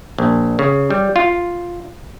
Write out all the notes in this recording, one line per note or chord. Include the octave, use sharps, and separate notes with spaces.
A#1
C#3
G3
F4